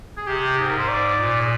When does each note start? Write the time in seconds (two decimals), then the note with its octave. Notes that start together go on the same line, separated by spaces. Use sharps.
0.17 G#4
0.27 C3 G4
0.58 G#2 G#4
0.68 A#4
0.79 C5
0.89 D5
1.20 A#2
1.40 G#4